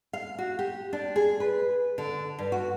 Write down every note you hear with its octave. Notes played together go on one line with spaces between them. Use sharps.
F5
F#4
G4
D4
G#4
B4
D3
G2
F#4